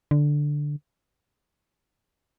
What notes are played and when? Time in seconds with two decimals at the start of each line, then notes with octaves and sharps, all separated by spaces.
0.11 D3